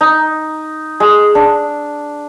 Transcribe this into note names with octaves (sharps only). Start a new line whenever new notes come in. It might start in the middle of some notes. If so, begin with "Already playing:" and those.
D#4
G#3
D4